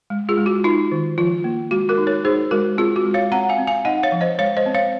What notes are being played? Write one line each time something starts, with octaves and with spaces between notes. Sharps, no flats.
G#3
F4 G#4
G#3
F#4
D#4 F4
D#3
F3 F4
A#3
G#3 F#4
F#4 A#4
D#4
A#4 C#5
D#4 G#4 C5
G#3 F#4 A#4
C4 F4 G#4
F#4
G#3
C#5 F5
C4 F#5 A#5
F5 G#5
C4
F5 G#5
D#4 D#5 F#5
C#5 F5
F3
C5 D#5
G#3 C#5 F5
C5 D#5
C4
C#5 F5